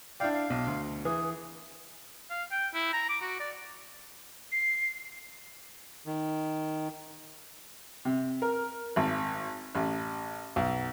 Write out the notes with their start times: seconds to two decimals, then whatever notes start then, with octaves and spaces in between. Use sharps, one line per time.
0.20 D4 E4 D5 F5 G5
0.34 F5
0.50 B1
0.67 D2
1.05 E3 G#4
2.30 F5
2.52 G5
2.75 E4
2.93 A#5
3.09 D6
3.22 F#4
3.40 D5
4.52 C7
6.06 D#3
8.05 C3
8.42 A#4
8.96 G#1
9.75 A1
10.56 B1